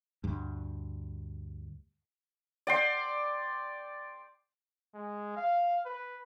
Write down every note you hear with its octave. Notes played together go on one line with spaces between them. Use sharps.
D2 G2
D5 G5 C6
G#3
F5
B4